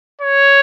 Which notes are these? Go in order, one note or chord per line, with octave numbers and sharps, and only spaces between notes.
C#5